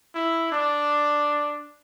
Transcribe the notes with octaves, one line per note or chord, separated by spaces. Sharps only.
E4
D4